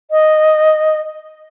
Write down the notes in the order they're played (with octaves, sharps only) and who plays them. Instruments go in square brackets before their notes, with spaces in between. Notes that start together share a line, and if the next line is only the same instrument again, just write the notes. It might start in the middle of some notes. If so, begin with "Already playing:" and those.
[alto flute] D#5